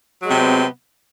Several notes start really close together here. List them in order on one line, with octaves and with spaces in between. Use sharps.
F#3 G#3 C3 C4 B3